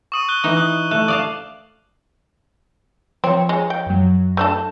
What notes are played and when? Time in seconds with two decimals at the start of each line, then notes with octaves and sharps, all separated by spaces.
0.12 C#6 D#6 D#7
0.29 F#6 G7
0.44 E3 D#4
0.57 D#6 F#6
0.91 A3 F#6
1.08 D5 F5 A5 D#6
3.24 F3 C4 C#5 C#7
3.49 G#3
3.70 G5
3.86 F#2 F#3
4.37 A3 D4 A4